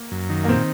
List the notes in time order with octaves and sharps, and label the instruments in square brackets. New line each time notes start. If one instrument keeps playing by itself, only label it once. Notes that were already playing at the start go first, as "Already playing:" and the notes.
Already playing: [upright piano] A#3
[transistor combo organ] F#2
D#3
[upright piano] A#3
[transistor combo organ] A#2 [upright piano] C4